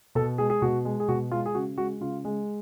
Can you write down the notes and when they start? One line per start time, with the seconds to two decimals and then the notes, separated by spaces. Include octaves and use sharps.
0.15 B2 A4
0.38 G#3 G#4
0.50 G#4
0.62 B2 F#4
0.85 G#3
1.00 G#4
1.08 B2 F#4
1.32 G#3 F4
1.46 G#4
1.54 C#3 F#4
1.77 G#3 F#4
2.01 C#3 F4
2.25 G#3